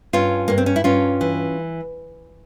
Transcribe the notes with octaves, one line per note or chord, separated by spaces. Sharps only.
G2 C#4 F4
G2 A#3
C4
C#4
E4
G2 C#4 F4
E3